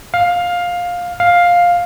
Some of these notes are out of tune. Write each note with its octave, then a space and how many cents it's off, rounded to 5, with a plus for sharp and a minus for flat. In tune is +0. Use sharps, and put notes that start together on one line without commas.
F5 +15
F5 +10